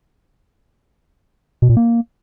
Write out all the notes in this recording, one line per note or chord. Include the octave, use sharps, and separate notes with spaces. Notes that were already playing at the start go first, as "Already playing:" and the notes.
B2
A#2
A#3